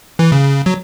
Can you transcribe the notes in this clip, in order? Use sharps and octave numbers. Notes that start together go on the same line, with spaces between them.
E3
C#3
F#3